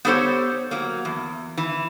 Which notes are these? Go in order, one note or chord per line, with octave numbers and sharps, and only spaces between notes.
B3 G4 A4 C5 C#5
F#3 A#3
E2
E3